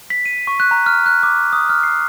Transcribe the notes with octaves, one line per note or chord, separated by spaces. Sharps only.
B6
D#7
C#6
F#6
A#5
F6
F#6
D6
D#6
F6
C7